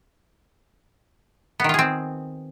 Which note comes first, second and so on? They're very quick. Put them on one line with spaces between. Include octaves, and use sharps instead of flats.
B3 D#3 F4 G#4 C4